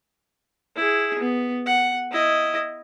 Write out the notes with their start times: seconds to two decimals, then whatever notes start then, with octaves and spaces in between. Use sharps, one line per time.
0.76 E4 G#4
1.19 B3
1.66 F#5
2.12 E4 D#5